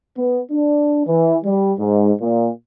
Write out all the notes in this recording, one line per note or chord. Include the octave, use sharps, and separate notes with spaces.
B3
D4
E3
G3
G#2
A#2